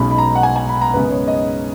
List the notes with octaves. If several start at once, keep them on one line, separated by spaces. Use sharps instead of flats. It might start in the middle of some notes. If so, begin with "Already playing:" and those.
Already playing: B1 B2 G#3 C#4 B5
B5
A#5
F#5
G#5
G#5
B5
A#5
F#2 C#3 G#3 B3 B4
C#5
D#5